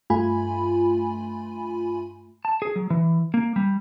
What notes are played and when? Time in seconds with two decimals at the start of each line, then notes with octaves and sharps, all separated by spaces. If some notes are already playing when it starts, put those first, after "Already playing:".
0.10 G2 A3 F4 G#5 B5
2.45 A5
2.62 G#4
2.76 F#3
2.90 E3
3.34 A#3
3.56 G3